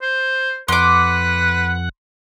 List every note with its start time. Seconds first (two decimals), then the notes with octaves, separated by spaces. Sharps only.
0.02 C5
0.68 F2 B4 F#5 C6 D6